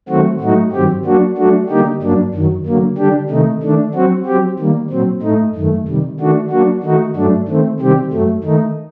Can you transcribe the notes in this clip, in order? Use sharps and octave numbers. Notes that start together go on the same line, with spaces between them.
D#3 F#3 A3 C4 F#4
A2 F#3 A3 D#4 F#4
G2 D#3 F#3 C4 G4
F#3 A#3 D4 F#4
F#3 A3 D4 F#4
D3 G3 A#3 D#4 G4
G2 F#3 A#3 D4
F#2 D#3 F#3
D3 F#3 A#3
D3 G3 D4 G4
C3 D#3 A3 D#4
D#3 A3 D4
F#3 C4 F#4
F#3 C4 G4
D#3 G3 A#3
A#2 F#3 C4
A2 A3 D#4
F#2 D#3 A3
C3 D#3 G3
D#3 A3 D4 F#4
F#3 A#3 D4 F#4
D#3 A3 D#4 F#4
G2 F#3 A3 D4
D#3 A3 C4
C3 D#3 G3 C4 G4
F#2 F#3 A3
D#3 A3 D#4